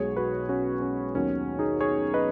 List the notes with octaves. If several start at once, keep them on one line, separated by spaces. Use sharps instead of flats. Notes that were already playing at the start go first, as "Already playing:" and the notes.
Already playing: B1 B2 G#3 B3 G#4 C#5
F#4 B4
C#4 F#4
C#4
D#2 D#3 F#3 B3 C#4
D#4 G#4
G#4 C#5
B4 D#5